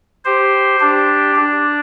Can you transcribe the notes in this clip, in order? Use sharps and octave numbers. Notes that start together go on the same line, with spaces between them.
G4 C5
D4 G4
D4